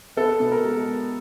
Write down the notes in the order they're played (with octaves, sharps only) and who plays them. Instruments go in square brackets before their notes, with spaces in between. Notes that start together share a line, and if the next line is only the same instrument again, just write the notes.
[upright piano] B3 [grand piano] A4
[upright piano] B2
[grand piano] A#4
[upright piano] G#3